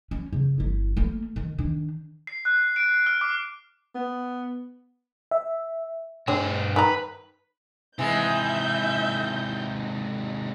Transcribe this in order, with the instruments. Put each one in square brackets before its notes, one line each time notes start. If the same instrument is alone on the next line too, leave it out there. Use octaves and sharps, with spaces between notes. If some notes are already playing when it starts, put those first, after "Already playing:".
[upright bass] C#4
C#3
G1 E4
A3 A#3
D#3
D#3 D4
[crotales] C7
F#6
D7
F6
D6
[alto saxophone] B3
[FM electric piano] E5
[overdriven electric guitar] G2 G#4 [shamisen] C4 D4 C#5
[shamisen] D#3 A#5 [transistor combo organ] B4
[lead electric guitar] G#2 C3 [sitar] E3 G#3 [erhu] E5 [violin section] G6